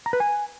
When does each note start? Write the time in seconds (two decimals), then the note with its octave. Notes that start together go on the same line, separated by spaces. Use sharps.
0.06 A#5
0.13 B4
0.20 G#5